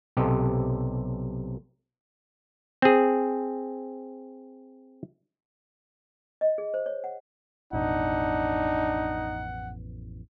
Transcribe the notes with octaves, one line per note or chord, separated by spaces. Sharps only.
B1 C3 G4 A4 D#5
C4 G#4
D#5
G#4
C5
C#5
F#5
A1 F2 B2 D4 D#4 F#5